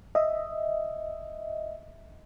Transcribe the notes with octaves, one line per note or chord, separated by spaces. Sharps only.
D#5 E5